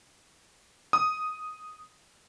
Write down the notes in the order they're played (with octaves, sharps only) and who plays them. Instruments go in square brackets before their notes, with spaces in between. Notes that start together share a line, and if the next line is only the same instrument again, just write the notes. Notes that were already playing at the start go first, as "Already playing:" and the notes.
[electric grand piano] D#6